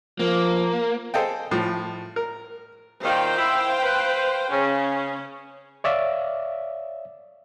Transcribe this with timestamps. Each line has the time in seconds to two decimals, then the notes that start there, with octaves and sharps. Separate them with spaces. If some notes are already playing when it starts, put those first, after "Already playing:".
0.19 F3 A#3
1.14 G#4 A4 C5 D#5 F5 G5
1.51 A2 F3
2.16 A#4
3.03 A#2 D#3 C5 F5 G5
3.38 E4
3.82 B4
4.52 C#3 C#4
5.84 C#5 D5 E5 F5